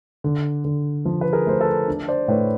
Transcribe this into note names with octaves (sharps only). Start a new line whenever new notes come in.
D3
D3
F3
B4
G#4 A#4
A3 C5
A4 B4
D4
C5 D5
A2 B4 C#5